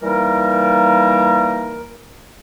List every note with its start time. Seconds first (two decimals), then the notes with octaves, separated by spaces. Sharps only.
0.02 E3 G3 A#3 D#4 A#4